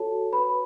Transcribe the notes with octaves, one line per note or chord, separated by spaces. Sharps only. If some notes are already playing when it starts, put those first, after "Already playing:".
Already playing: F#4 A4 C#5 A5
B4 B5